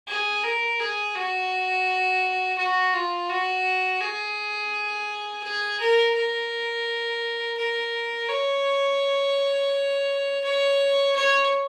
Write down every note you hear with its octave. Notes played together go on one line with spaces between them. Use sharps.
G#4
A#4
G#4
F#4
F#4
F4
F#4
G#4
G#4
A#4
A#4
A#4
C#5
C#5
C#5